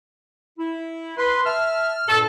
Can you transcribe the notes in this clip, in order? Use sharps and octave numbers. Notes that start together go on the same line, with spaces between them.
E4
B4 C6
E5 A5 F6
G2 A#2 A4